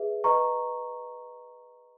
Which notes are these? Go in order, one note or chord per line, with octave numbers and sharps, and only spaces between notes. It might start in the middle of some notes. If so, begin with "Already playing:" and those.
Already playing: G#4 B4 E5
B4 D#5 A#5 C#6